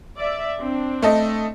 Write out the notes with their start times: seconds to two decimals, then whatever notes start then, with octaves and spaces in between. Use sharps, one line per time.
0.17 D5 E5
0.60 C4 D4
1.02 A3 A4 D#5